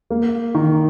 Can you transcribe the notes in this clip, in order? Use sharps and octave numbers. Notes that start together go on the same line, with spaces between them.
A#3
D#3